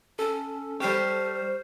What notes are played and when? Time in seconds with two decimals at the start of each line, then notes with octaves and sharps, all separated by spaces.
0.19 C#4 A4
0.80 G3 G4 C5 C#6 F6 C7